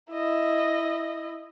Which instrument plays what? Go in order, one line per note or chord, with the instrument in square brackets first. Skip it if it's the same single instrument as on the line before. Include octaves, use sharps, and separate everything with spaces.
[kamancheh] E4 D#5